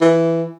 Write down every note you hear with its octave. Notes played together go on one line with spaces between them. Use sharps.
E3